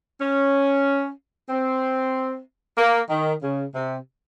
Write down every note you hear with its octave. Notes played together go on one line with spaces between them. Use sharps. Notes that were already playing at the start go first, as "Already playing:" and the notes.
C#4
C4
A#3
D#3
C#3
C3